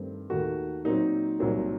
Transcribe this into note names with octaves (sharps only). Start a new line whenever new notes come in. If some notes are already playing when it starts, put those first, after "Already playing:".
Already playing: G2 D#3 A3 C4
D#2 D#3 A3 F#4
A#2 F#3 C4 D#4
C2 A#2 F#3 C4